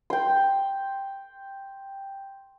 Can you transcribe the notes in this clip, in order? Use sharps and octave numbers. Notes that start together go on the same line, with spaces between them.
G5 C6